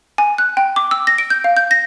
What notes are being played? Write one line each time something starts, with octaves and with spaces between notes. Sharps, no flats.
G#5
F#6
G5
D6
E6
A#6
D7
G6
F5
G6
A#6